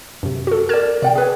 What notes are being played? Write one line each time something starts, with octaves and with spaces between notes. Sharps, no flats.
F#2 C3
F#4 A4
A#4 D5 F6 G#6 E7
C3 D5 F#5 G5
G#4 B4 C#5